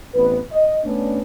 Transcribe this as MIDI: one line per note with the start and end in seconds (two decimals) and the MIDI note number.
0.15 0.38 33
0.15 0.38 59
0.15 0.38 60
0.15 0.38 71
0.52 0.79 75
0.85 1.20 57
0.85 1.20 59
0.85 1.20 61
0.85 1.20 62